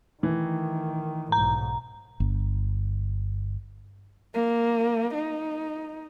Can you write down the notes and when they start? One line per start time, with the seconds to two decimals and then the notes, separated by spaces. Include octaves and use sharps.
0.23 D#3 E3 A3
1.32 B1 G#2 A#5
2.20 G1
4.34 A#3
5.14 D#4